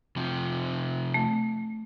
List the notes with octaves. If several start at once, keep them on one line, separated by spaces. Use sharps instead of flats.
C3 F3
A3